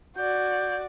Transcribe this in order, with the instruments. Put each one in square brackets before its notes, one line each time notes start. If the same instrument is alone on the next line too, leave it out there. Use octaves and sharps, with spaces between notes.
[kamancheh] F#4 D5 [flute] G6